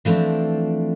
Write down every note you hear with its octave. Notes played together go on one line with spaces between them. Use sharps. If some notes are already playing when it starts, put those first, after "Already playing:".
E3 F3 A3 C4 D4